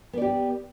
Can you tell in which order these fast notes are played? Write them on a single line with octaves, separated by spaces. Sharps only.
B3 D5 G4